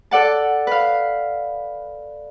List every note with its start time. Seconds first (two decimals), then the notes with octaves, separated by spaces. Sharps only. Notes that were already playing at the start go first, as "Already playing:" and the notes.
0.11 A4 D5 F#5 A5
0.67 B4 F5